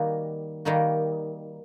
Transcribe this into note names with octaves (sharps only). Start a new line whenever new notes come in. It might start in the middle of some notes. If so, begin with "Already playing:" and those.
Already playing: D#3 G3 A#3 D#4 F#4
D#3 G3 A#3 D#4 F#4